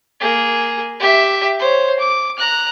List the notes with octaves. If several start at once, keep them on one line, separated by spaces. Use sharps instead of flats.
A#3 G#4
G4 E5
C5 C#5
D6
A#5 F#6